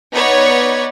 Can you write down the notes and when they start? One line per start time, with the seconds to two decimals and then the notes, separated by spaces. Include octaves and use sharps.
0.11 B3 D#4 C#5 D5 F#5 G#6